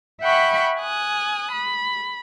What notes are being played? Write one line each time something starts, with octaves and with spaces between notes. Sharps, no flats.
E5 F#5 G5 B5 C#6
G#5 D#6 F#6
B5